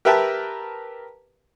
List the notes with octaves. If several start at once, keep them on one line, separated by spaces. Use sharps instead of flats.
G4 A#4 B4 E5 G5 A5